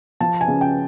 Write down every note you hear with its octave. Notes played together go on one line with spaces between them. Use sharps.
F3 A5
G#5
C#3
G5